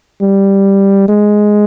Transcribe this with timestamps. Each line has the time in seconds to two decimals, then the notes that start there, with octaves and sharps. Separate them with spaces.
0.21 G3
1.09 G#3